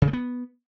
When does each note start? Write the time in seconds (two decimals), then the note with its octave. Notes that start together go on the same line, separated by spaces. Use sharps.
0.02 C#3
0.08 A3
0.13 B3